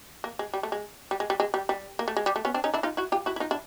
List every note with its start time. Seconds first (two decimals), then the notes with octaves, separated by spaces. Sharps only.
0.24 A#3
0.39 G#3
0.54 G3
0.63 A3
0.72 G#3
1.11 G3
1.20 G#3
1.30 G3
1.40 G#3
1.54 G3
1.69 G3
1.99 A#3
2.08 A3
2.17 G#3
2.26 G3
2.36 A3
2.45 B3 C#4
2.54 C4 D4
2.64 C#4 D#4
2.74 D4 E4
2.83 D#4 F4
2.97 E4 F#4
3.12 F4 G4
3.26 E4 F#4
3.36 E4
3.40 D#4 F4
3.51 D4 E4